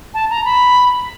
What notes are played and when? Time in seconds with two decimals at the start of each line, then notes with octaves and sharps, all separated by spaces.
0.14 A5
0.30 A#5
0.45 B5